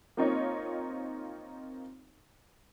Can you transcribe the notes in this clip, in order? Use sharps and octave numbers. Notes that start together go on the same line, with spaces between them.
A#3 C4 D#4 F4 C#5 D#5